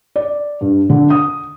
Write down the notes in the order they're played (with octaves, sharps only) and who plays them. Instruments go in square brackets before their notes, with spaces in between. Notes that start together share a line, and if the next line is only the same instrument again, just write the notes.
[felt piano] D5
G2
D3
D#6